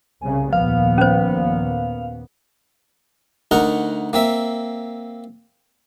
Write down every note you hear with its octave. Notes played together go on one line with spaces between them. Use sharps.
C2 C#3 G#5
D#2 A#2 F3 B3 F5
C#4 C5
D2 D#4 A#4 F#5
A#3 C4 E5